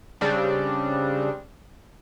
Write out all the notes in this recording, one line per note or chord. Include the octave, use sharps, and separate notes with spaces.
C#3 G3 C4 D4